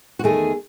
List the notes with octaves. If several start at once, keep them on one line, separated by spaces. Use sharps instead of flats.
F#4
E2 D#3 A3 G#4